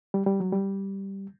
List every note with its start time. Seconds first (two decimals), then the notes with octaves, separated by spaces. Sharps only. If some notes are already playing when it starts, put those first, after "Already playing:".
0.14 G3
0.26 G3
0.40 F#3
0.53 G3